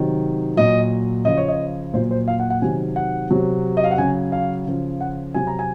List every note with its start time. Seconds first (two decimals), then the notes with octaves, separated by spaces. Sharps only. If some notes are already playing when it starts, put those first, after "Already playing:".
Already playing: C3 D#3 F#3
0.57 A#2 F#3 D#5
1.25 C#3 F3 D#5
1.37 C#5
1.48 D#5
1.94 A#2 F#3 C5
2.11 C5
2.28 F5
2.40 F#5
2.50 F#5
2.62 C3 D#3 F#3 G#5
2.96 F#5
3.30 C3 F#3
3.77 D#5
3.84 F5
3.91 F#5
3.98 C#3 F#3 G#5
4.32 F5
4.67 C#3 F3
5.01 F#5
5.34 C3 F#3 G#5
5.47 A#5
5.59 G#5